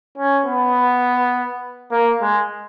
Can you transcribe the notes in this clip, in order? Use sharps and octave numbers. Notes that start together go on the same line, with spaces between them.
C#4
B3
A#3
G#3